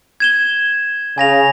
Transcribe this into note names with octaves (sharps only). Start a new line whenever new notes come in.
G#6 E7 G7
C#3 G#5 A#6 F7